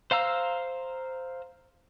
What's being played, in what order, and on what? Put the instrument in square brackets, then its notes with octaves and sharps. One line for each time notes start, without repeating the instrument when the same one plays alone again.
[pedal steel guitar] C5 F5 A#5 E6